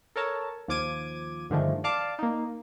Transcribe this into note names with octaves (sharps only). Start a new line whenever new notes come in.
A4 A#4 C#5 A5
D#2 F3 F4 D6 G#6 D#7
G2 D3 D#3 F3 G#3 A3
D5 F5 A5 D6
A#3 D#4